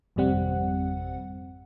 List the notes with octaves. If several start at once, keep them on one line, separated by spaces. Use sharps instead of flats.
G#1 F2 C3 G3 C4 F#5